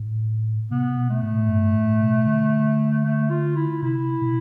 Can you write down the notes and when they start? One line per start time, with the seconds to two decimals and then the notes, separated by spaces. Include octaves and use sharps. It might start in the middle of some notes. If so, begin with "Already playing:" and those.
Already playing: A2
0.71 C3 B3
0.97 B2
1.10 A3
1.23 A2
1.49 G2
1.75 A2
2.01 B2
2.26 D3
3.05 A3
3.30 F4
3.56 E4
3.82 C3 E4
4.22 B2